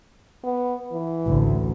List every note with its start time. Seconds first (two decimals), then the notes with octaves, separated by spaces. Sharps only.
0.44 B3
0.92 E3
1.26 A1 D2